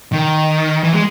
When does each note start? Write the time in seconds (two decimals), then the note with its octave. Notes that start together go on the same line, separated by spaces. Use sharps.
0.13 D#3
0.84 E3
0.93 G#3